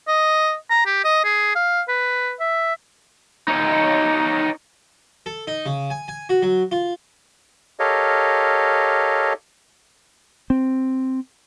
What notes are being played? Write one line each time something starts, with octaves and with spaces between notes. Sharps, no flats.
D#5
A#5
G4
D#5
G#4
F5
B4
E5
D#4 C#5
A4
D#4
C#3
G#5
G#5
F#4
F#3
F4
G4 A4 A#4 C#5 D#5 F5
C4